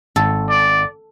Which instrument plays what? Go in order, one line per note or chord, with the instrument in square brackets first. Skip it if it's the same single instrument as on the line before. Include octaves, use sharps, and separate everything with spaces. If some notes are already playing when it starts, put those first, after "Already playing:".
[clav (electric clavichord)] G#1 [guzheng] A4
[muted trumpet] D5